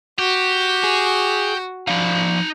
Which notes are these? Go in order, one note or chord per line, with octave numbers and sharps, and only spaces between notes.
F#4 G4
G#4
F3 D#4 D5 F5 B5